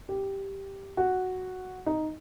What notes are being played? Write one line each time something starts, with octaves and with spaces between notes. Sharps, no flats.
G4
F#4
D#4